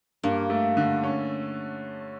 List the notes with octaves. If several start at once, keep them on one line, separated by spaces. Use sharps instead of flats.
G2 A#3
A3
D3
C#4